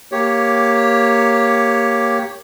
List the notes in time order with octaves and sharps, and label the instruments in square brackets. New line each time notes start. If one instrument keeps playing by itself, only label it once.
[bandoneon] A#3 G4 C#5